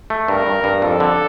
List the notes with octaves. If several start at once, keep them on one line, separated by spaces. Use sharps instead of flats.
A3
G2 A#4
G2
G2
F2 A4
D3